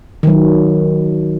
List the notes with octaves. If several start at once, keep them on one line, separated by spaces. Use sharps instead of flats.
D#3 F#3